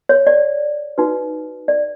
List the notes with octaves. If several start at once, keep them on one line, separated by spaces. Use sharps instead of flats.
C#5
D5
D#4 F#4 B4
D5